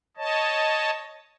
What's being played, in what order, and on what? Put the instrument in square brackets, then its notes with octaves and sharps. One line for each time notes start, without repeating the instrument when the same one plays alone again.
[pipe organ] C#5 D#5 A5